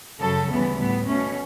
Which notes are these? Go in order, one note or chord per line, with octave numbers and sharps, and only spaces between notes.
F#2 C#3 F#3 A4
D2 C#3 E3 G3 B3
A2 G3 B3
B2 A3 C#4